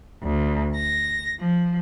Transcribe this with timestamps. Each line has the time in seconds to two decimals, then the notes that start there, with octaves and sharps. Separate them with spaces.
0.23 D2
0.75 A#6
1.41 F3